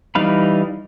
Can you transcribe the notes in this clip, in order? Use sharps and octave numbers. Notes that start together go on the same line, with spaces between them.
E3 G3 D#4 F5 B5